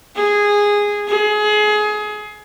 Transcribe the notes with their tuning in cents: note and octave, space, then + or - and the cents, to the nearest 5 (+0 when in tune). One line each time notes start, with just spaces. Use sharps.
G#4 -10
G#4 +25